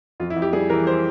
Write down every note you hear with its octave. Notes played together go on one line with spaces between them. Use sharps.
F2 F4
E4
F2
G4
G3 G#4
E3 A#4
C5